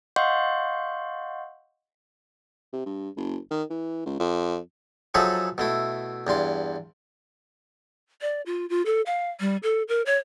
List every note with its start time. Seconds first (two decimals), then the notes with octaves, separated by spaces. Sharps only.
0.16 D#5 F5 F#5 C6 C#6 G6
2.73 C3
2.86 G2
3.16 F#1
3.50 D#3
3.70 E3
4.06 C#2
4.19 F2
5.14 F3 F#3 D#4 G#4 A4 E5
5.58 B2 A3 E4
6.27 E2 G2 C6 D6
8.21 D5
8.46 F4
8.69 F4
8.86 A4
9.06 F5
9.40 G3
9.63 A4
9.88 A#4
10.06 C#5